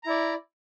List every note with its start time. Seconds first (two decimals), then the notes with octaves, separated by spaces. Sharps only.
0.03 A#5
0.07 E4
0.10 D5